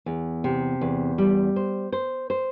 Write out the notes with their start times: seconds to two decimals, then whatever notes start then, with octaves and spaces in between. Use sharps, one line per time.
0.06 E2
0.44 C3
0.81 E2
1.18 G3
1.56 C5
1.92 C5
2.30 C5